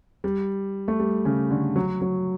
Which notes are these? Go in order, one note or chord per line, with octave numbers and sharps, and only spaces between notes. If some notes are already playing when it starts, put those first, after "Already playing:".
G3
A3
G3
C#3
D3
F#3
F#3